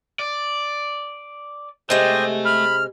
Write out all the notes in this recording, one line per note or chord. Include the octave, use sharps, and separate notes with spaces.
D5
C3 G#3 A3 G4 C5 D#5
B5 F6